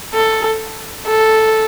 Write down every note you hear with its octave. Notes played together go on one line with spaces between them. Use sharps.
A4
A4